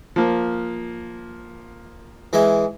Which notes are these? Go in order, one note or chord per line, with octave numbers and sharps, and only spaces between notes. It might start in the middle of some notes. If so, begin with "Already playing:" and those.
F3 A#3
E3 G#3 E5